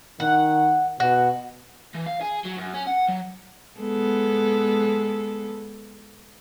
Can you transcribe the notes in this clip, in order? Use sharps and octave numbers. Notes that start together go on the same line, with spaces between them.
D#3 F#5
B2 F#4
E3
F5
G#4
F#3
F#2
C#4
F#5
F#3
G#3 B3 A4